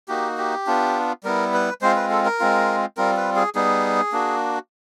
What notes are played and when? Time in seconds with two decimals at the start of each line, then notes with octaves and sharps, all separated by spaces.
0.08 A#3 D#4 F#4 G4
0.38 G4
0.67 B3 D4 F4
1.24 G3 B3 E4 A#4
1.54 B4
1.82 G#3 C4 F4 C5
1.96 B4
2.11 A4
2.26 A#4
2.40 G#3 C4 F4
2.97 G3 C4 F4 A#4
3.17 B4
3.36 G#4
3.55 G3 B3 D#4 G#4
4.12 A#3 D4 F#4